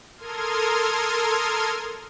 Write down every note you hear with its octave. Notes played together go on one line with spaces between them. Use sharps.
A4 A#4 C6 D#6 F6 G#6